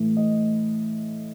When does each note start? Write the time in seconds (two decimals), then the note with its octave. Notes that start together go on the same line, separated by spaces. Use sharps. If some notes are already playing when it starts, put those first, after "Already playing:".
Already playing: A2 E3
0.17 D#5